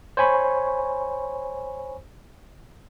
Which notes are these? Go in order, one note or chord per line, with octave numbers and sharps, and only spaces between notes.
C5 C#5 G#5 B5 C#6